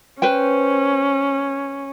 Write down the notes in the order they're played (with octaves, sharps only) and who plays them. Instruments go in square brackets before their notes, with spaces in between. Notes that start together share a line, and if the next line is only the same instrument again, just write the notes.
[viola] C#4 [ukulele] B4 C5 G5